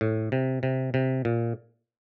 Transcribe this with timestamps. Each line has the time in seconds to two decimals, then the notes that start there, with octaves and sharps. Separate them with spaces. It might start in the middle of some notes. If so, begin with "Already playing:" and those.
0.01 A2
0.32 C3
0.63 C3
0.94 C3
1.25 A#2